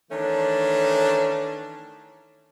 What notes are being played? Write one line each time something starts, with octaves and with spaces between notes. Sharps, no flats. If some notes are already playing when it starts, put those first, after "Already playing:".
D#3 E3 A3 C#4 D4